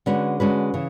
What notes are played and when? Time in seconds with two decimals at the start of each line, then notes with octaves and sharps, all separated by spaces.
0.06 D3 G#3 C#4 F#4 B4
0.40 D3 G#3 C#4 F#4 B4
0.74 C#3 E3